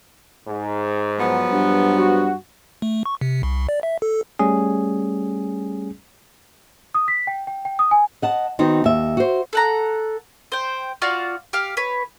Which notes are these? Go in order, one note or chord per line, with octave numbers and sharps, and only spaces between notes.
G#2
F3 F#3 B3
G2
F#4
A3
C#6
C3
C2
D5
E5
A4
G3 A3 C#4 G#4
D#6
B6
G5
G5
G5
D#6
G#5
D#5 F#5 A5
D#3 B3 C4 D#4 F#4
D#2 E5
F#4 C5
A4 F#5 A#5
C5 G5
F4 F#4 D5 F5
G4 F5
B4 C#5